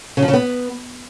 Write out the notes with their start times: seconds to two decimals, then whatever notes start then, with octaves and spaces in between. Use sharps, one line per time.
0.17 C#3
0.22 F3
0.28 C#3
0.33 B3